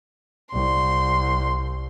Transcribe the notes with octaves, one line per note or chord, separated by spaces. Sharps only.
C2 C6